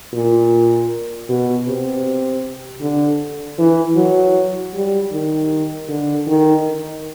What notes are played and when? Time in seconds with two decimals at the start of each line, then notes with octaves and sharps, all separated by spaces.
0.14 A#2
1.29 B2
1.67 C3
2.81 D3
3.59 E3
3.96 F#3
4.74 G3
5.12 D#3
5.89 D3
6.27 D#3